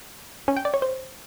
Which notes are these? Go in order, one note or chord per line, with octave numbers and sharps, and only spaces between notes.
C#4
G5
D5
C#5
C5